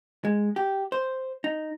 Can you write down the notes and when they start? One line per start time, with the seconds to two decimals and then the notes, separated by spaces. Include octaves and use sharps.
0.25 G#3
0.56 G4
0.92 C5
1.44 D#4